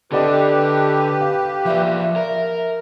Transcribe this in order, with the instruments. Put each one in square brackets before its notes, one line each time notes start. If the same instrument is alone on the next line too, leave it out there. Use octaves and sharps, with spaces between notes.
[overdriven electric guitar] D3 [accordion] G4 B4 [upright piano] A4 D5 D#5
[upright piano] F5
[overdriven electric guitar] F3 D5 [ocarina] E5
[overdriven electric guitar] A#4